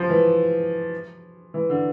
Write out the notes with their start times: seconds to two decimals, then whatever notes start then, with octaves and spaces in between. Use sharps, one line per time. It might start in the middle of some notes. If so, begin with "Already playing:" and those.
Already playing: F3
0.10 E3
1.54 E3
1.70 D3